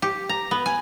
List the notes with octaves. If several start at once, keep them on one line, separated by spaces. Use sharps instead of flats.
G4
A#5
B3
G#5